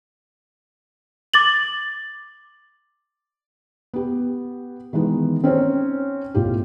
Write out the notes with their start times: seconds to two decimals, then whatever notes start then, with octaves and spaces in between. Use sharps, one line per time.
1.34 D6 A6 F#7
3.94 B3 G4
4.93 D#3 E3 G#3 B3
5.44 C4 C#4 D#4 C5
6.34 B1 A2 F4 G4